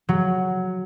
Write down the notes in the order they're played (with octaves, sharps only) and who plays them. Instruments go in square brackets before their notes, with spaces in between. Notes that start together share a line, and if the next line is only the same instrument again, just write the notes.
[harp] F#3